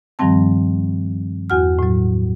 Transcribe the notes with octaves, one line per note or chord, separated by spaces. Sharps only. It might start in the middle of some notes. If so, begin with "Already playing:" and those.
G2 D#3 F3 G3 C4 A5
E2 F#4 F#5 F6
A2 F#3